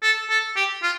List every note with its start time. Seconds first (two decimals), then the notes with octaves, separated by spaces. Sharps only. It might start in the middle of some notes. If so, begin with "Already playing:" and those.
0.03 A4
0.30 A4
0.56 G4
0.83 F4